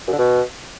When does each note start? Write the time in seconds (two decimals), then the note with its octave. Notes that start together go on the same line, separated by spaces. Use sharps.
0.08 F#2
0.13 D3
0.18 B2